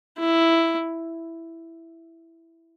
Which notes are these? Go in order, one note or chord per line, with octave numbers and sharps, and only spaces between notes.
E4